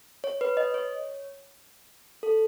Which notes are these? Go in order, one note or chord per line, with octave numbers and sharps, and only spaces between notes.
C#5
B4
D#5
C#5
A4